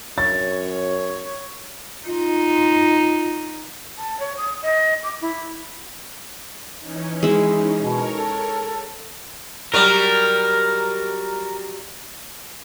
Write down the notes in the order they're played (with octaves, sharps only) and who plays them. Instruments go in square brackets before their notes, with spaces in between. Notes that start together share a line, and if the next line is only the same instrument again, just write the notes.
[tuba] F#2 [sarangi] C#5 [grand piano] A6
[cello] D#4 [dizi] F4
[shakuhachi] A5
C#5
D#6
D#5
D6
E4
[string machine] E3 C#4 D#4
[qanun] G#3 E4
[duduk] B2 [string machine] A#4 C#5
[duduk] A4
[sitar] F#3 G3 [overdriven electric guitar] A#4